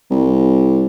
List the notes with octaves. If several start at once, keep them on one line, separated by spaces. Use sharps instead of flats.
C2